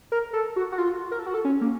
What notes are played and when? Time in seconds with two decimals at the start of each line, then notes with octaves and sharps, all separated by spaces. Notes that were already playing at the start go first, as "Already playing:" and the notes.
0.12 A#4
0.33 A4
0.56 F#4
0.72 F#4
0.78 F4
1.11 A#4
1.19 A4
1.26 F#4
1.34 A4
1.45 C#4
1.61 A#3